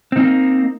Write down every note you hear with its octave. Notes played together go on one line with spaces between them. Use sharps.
A#3 C4 D#4